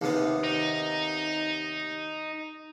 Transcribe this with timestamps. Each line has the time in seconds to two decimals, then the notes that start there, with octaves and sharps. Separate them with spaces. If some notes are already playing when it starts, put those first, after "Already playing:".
0.01 D#2 C3 B3
0.44 D#4